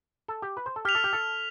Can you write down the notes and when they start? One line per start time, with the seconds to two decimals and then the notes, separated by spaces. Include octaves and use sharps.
0.28 A4
0.42 G4
0.57 B4
0.66 C5
0.76 A4
0.85 G4 F6 B6 F7
0.95 A4
1.04 G4
1.13 A4